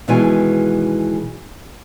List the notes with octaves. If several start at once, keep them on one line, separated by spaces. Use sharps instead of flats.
B2 D#3 E3 G#3 G#5